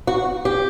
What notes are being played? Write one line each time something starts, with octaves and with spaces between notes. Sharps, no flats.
F#4
G4